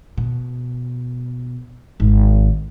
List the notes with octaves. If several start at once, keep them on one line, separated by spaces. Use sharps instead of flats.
B2
G#1